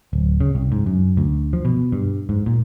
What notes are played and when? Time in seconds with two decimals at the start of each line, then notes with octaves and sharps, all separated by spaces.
0.13 D1
0.41 C#3
0.55 C2
0.72 G#2
0.86 F#2
1.17 D2
1.53 F3
1.65 B2
1.92 G2
2.29 G#2
2.46 A#2